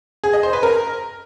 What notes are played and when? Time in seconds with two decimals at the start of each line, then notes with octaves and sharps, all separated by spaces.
0.24 G#4
0.33 D#5
0.43 C5
0.53 B4
0.63 A#4